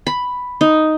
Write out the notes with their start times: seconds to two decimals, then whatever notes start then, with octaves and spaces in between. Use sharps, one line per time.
0.07 B5
0.61 D#4